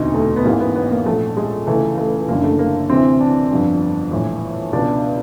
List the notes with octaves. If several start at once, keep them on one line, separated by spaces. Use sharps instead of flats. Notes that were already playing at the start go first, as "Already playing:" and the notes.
Already playing: E1 D2 C3 D#4
A3
B3
A1 G#2 E3 A#3
B3
B3
A#3
A#1 A#2 A3
G#3
C#2 C#3 E3 A3
A3
F#1 F#2 D3 A#3
A3
A#3
D2 C3 E3 C4
D4
G1 F2 D3
A#1 A2 E3
C#2 B2 D4